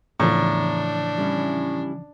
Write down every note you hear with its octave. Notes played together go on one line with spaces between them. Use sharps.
E2 A2 C#3 E3 F3 D4 A#5
G3 C#4 E4